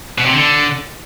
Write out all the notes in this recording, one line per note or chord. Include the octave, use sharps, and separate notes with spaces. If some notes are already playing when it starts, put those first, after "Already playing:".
B2
C3
D3